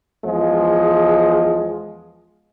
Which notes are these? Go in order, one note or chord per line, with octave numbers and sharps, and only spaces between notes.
E2 F3 G#3